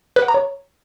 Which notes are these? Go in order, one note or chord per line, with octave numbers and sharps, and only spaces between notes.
B4
F#5
A#5
C#5